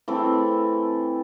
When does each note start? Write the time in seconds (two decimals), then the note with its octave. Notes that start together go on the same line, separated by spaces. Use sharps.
0.08 E3 A3 C4